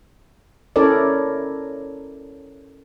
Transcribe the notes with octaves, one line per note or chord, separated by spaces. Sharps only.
C#4 E4 A4 A#4 C#5 D5